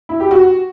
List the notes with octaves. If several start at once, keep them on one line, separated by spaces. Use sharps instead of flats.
E4
G4
F#4